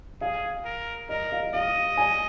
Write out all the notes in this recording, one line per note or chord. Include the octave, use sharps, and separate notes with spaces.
G#4 F5
A#4
A#4 D#5
F5
D#5 F5
G#5